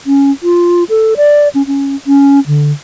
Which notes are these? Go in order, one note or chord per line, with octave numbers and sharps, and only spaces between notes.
C#4
F4
A4
D5
C#4
C#4
C#4
D3